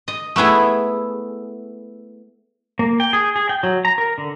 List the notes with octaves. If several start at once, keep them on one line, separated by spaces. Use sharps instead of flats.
D#5
A3 B3 E4 G#4
A#3
G5
G#4
G#4
G5
F#3
A#5
A#4
D3